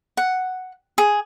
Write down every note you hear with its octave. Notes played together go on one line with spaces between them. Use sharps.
F#5
G#4